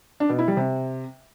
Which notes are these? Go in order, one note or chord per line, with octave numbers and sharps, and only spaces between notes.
D4
B2
E4
G3
C3